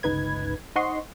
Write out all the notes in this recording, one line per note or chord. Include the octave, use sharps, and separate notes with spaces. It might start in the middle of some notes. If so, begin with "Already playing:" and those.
G1 C#2 D#4 B4 G#6
D#4 C5 D#5 F#5 C6 C#6